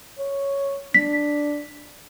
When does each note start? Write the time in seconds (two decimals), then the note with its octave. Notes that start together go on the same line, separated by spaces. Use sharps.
0.19 C#5
0.94 D4 B6